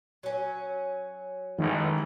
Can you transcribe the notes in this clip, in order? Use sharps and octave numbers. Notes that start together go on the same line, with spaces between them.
F#3 C#4
A1 D#3 G#3